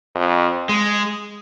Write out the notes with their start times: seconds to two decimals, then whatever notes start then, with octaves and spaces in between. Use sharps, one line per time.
0.15 F2
0.69 G#3